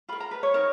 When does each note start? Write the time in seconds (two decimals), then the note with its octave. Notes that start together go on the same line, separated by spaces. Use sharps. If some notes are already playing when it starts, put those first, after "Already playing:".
0.09 F4 A#4 B5
0.20 A#5
0.31 B4
0.43 C#5
0.54 D#4 A#4 C#5